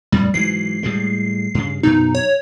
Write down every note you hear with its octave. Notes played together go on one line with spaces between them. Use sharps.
F2 A2 G3
G#2 E3 F#3 C7
A2 G3 G#3
G2 C#3
F#2 B2 D#4
C#5